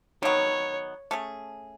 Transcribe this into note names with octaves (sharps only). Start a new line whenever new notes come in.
D#3 F#3 B3 C#5
A3 C#4 G#4